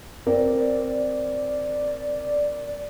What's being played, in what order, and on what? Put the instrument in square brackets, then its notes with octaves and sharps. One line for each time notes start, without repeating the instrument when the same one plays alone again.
[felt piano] C4 A#4 [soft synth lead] D5